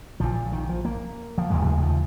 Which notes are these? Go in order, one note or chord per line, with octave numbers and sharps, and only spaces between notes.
A#1 A#2 F3
D#3
F3
A#3
F3
F1 D#2 C#3 G#3
F3
G#3
G#3
F3